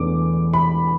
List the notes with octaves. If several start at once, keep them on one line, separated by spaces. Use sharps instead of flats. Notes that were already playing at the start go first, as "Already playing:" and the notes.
Already playing: E1 E2 E3 A3 D4 D6
B5